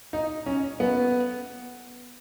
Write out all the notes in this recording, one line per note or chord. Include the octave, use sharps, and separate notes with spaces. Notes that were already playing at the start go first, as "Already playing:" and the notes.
D#4
C#4
B3